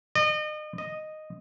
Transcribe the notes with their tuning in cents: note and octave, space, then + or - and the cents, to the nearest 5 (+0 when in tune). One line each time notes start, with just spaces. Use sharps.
D#5 -35
D#5 -5